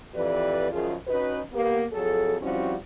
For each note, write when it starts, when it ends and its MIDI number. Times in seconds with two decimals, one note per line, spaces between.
0.15 0.71 41
0.15 0.71 52
0.15 0.71 67
0.15 0.71 71
0.15 0.71 74
0.72 0.95 42
0.72 0.95 51
0.72 0.95 53
0.72 0.95 65
0.72 0.95 68
1.08 1.40 61
1.08 1.40 63
1.08 1.40 66
1.08 1.40 71
1.53 1.84 58
1.53 1.84 59
1.53 1.84 67
1.92 2.37 41
1.92 2.37 54
1.92 2.37 68
1.92 2.37 69
2.42 2.74 53
2.42 2.74 55
2.42 2.74 60
2.42 2.74 61
2.42 2.74 64
2.42 2.74 66